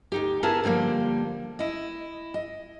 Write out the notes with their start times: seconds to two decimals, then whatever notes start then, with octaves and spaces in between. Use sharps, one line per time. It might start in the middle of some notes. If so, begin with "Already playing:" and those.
0.12 D2 D#4 G4
0.43 B3 E4 G#4 A#4 A5
0.64 D3 F3 G3 A#3
1.59 E4 D#5
2.34 D#5